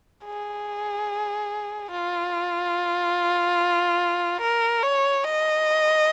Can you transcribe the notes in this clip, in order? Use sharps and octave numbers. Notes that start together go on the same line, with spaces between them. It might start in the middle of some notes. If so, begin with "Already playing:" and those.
G#4
F4
A#4
C#5
D#5